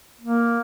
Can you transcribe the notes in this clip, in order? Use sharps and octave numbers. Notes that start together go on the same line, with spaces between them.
A#3